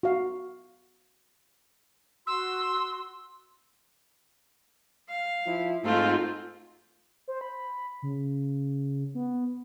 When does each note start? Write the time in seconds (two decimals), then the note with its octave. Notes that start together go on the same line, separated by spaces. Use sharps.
0.03 F#4 F5
2.27 F#4 C6 E6
5.09 F5
5.46 F3 E4 F4
5.84 G#2 A3 C4 F4
7.28 C5
7.41 B5
8.02 C#3
9.15 B3